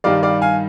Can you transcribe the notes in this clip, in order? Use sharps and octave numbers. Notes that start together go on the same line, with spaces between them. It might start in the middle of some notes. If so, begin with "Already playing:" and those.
G2 D#3 G3 D5 F5
D5 F5
F5 G#5